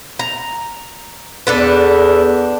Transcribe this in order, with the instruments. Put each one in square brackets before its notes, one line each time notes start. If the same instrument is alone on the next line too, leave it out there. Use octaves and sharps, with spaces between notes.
[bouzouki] A#5
[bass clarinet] E2 [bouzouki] D4 A4 B4